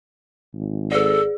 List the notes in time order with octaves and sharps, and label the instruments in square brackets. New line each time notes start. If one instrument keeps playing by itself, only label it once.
[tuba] G#1
[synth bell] G#4 D5 [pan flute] A4